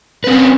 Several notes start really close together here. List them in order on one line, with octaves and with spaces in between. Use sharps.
B4 C4 C#4